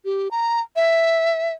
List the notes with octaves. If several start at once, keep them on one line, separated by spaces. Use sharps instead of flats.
G4
A#5
E5